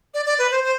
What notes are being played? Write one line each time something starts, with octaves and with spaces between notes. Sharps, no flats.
D5
D5
B4
C5
C5